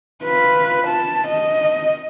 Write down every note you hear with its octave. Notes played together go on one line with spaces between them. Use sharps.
F4 B4
A5
D#5